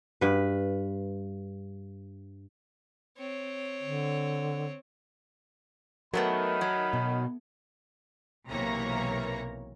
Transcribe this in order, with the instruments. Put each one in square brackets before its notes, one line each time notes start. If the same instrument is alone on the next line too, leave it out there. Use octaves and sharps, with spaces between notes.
[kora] G2 B4
[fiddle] C4 C#5
[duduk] D3
[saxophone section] D#3 [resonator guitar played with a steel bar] F#3 A3 B3 [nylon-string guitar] A#4 [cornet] B5
[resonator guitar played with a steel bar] F#3
[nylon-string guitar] B2
[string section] B1 C3 E3 A#3 C#5 A#5